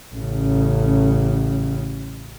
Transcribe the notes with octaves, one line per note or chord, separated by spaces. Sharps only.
A1 C#3